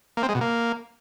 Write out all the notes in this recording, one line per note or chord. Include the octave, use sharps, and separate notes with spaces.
A#3
C4
G#3
B2
A#3